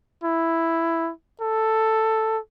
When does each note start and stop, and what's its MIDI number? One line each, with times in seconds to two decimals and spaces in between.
0.24 1.11 64
1.41 2.38 69